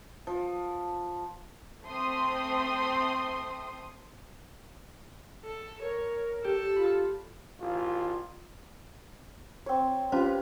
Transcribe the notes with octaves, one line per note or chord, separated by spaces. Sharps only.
F3
A3 C4 C6 D#6
A4
A#4 C#5
G4 A4
F4 B5
A1 F4
C4 C#5
C#4 F4 G4 B4 C5